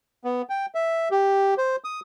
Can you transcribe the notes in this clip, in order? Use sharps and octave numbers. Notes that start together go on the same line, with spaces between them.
B3
G5
E5
G4
C5
D#6